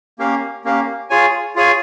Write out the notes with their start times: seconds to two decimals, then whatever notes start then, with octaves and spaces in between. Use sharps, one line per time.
0.19 A#3 C#4 G4 A#4 F5
0.64 A#3 C#4 G4 A#4 F5
1.10 F4 G#4 C#5 G#5
1.56 F4 G#4 C#5 G#5